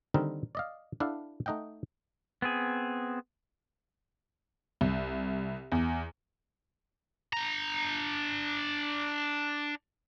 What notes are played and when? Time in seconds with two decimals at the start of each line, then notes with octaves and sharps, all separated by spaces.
0.14 D3 D#3 G3 C4 D#4 A#4
0.55 D5 D#5 F5
1.00 D4 E4 A4 F5 F#5
1.46 A3 D#4 D#5 F#5 G5
2.42 B3 C4 G#4
4.81 C2
5.72 E2
7.33 D4 A#5